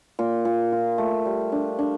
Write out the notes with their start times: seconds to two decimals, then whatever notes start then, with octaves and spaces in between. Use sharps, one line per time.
0.19 A#2
0.45 A#2
0.72 F4
0.98 A3
1.25 G3
1.52 D4
1.79 D4